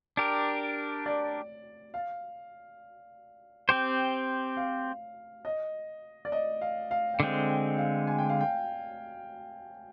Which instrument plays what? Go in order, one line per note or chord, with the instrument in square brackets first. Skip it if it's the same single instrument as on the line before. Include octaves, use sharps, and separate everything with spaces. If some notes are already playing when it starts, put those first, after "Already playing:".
[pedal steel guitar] D4 G4 A#4
[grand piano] D5
F5
[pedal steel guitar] C4 G4 C5
[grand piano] F5
D#5
D5
D#5
F5
F5
G5
[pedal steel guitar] D3 G#3 C4 [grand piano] F5
[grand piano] G5
F5
G#5
G5
F5
G5